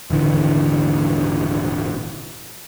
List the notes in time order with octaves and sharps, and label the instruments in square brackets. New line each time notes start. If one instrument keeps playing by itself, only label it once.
[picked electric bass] D#1 G#1 D3 E3